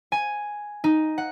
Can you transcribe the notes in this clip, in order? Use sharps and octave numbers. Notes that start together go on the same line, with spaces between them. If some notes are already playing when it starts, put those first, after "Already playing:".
G#5
D#4
F#5